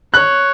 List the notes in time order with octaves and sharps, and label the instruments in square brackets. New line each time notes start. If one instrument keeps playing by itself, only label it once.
[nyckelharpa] C#5 [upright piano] F#6